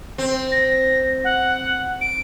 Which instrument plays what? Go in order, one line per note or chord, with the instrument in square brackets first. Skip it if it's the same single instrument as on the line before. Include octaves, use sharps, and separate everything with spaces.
[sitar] C4
[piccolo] A#6
F#5
D7